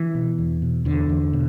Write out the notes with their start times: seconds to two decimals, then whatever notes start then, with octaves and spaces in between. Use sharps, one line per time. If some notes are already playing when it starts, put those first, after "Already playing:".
Already playing: E3
0.15 B2
0.38 E2
0.62 B2
0.85 E2 D3
1.09 E2
1.33 B2